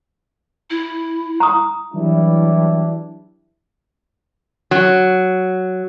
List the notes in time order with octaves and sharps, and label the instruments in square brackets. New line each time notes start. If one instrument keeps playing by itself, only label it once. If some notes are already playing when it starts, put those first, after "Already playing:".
[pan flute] E4
[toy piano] A#5 D#6
[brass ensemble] E3 F#3 G3 D4 E4
[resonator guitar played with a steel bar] F#3